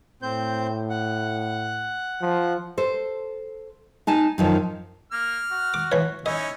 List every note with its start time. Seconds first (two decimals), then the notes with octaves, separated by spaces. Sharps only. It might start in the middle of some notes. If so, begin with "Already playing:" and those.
0.22 A2 C4 C5 G6
0.90 F#5
2.22 F3
2.78 A4 C5
4.07 D#4 G#5 A5
4.38 F#2 D#3 F3
5.12 A#3 F6
5.51 F#4
5.74 D6
5.92 E3 C#5
6.26 C#4 D#4 E4 D#5